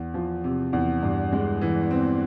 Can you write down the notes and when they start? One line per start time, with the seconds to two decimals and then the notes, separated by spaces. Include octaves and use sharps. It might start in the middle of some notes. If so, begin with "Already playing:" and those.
Already playing: E2
0.14 F3
0.44 C3
0.73 E2
1.03 G2
1.33 G#3
1.61 E3
1.91 C4